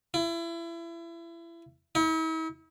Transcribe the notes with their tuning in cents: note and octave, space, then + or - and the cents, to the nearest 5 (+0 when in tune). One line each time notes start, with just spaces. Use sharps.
E4 +30
E4 -45